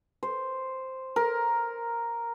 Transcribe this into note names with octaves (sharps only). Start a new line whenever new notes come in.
C5
A#4